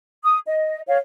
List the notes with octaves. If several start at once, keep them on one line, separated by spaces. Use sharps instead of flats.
D#6
D#5
C#5 F5